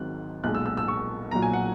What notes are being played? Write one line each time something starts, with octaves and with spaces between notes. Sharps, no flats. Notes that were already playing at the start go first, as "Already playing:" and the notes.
Already playing: G#1 G#2 D#3 F#3 F#6
B1 A#2 G#3 F#6
E6
E6
E6
C#6
B1 A#2 F#3 A#5
G#5
F#5